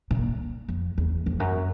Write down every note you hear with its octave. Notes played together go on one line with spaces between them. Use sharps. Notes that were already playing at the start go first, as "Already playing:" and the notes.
A#2
F2
E2
F2
F#2